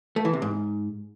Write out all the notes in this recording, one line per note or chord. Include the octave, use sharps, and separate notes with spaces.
A3
E3
C3
G#2